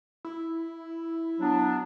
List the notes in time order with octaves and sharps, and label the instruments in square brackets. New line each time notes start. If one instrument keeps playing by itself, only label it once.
[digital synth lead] E4
[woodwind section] F#3 B3 D4